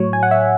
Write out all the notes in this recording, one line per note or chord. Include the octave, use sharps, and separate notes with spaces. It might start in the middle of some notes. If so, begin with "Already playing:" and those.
Already playing: A2 F#3 C#5
G#5
F#5
E5